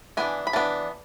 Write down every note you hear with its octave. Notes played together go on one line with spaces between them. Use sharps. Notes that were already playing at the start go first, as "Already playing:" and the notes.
E3 B3 D4 G#5
B5
E3 B3 D4 A5